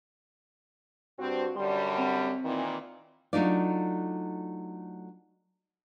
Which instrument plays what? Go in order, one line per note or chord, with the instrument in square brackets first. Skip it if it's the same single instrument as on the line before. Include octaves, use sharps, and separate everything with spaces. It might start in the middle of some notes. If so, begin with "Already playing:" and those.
[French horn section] G2 C4 [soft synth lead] F#4
[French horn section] F#2 D3 G3 [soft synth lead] C6
[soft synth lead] C4
[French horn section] A#2 D#3 E3
[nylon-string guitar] F#3 A3 D4 D#4 F4 D5